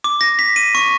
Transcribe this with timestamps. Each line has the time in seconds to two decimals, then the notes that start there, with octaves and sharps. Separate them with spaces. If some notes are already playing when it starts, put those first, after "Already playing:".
0.04 D6
0.21 A#6
0.39 B6
0.56 D#7
0.75 C#6